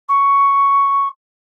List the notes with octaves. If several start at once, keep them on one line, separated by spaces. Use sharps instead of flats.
C#6